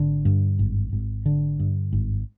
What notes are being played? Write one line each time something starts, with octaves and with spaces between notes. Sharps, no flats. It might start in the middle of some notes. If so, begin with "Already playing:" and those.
Already playing: G#1 D3
G2
G#1
G#1
D3
G2
G#1